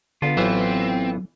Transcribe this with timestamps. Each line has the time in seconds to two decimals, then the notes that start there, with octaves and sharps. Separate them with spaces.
0.22 D3 B3 F4
0.37 A1 E3 F#3 C4 E5